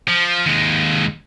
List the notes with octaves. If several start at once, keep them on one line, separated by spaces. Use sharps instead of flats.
F3
D#2 G#3